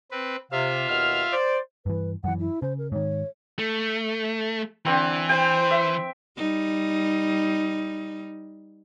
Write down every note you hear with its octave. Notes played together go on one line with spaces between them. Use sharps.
C4 B4
C3 F4 E5 F5
D#2 B2 F6
C5 D5
G2 E3 B4
F#2 E3 F#5
E4
C#3 C5
A#4
G#2 D#3 C#5
A3
D3 E3 C4 C5
C5 G5
E5
G3 D#4